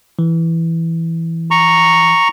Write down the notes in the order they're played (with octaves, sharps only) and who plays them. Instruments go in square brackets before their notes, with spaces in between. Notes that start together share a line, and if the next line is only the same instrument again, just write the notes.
[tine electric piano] E3
[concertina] A#5 C#6